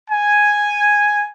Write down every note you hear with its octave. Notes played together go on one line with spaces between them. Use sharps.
G#5